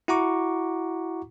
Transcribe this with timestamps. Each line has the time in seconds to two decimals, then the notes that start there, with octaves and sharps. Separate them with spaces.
0.08 E4 F#4 F#5 A#5 C#6 D6